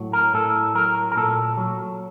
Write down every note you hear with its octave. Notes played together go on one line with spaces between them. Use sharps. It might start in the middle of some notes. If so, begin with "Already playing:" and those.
Already playing: A2 F#3
A#4
A2 A4
F#3 A#4
A#4
A#2 A4
F#3